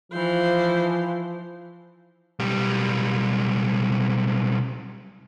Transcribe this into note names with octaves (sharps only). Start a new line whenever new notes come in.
E3 F3 C5
B1 G3